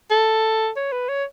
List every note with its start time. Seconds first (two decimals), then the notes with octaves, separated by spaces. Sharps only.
0.11 A4
0.76 C#5
0.93 B4
1.09 C#5